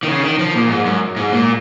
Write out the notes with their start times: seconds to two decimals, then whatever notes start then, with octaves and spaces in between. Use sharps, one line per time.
0.03 D#3
0.07 C#3
0.22 D#3
0.39 F3
0.54 A#2
0.70 G#2
0.85 F#2
1.16 G#2
1.32 A#2